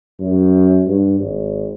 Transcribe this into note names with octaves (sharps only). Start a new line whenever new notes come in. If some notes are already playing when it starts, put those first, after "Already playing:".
F#2
G2
G#1